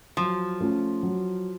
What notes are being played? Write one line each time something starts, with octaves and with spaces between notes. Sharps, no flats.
F3 F#3
A3 C#4 F4
F#3